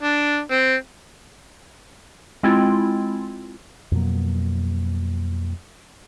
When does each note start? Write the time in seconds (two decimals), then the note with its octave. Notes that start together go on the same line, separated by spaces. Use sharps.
0.02 D4
0.51 C4
2.43 G#3 C4 E4 F4
3.92 F2 B2 F#3 A#3